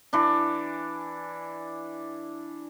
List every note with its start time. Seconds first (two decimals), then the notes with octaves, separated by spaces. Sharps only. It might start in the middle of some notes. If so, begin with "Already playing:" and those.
0.13 E3 D4